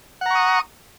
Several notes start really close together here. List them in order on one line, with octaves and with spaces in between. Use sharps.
F#5 A#5 C#6 D#6